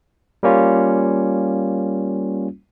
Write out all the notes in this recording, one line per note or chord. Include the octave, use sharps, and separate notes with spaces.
G3 A#3 C#4 F4